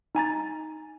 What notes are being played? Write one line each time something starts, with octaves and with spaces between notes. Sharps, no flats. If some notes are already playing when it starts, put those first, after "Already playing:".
D#4 G#5 A#5 A6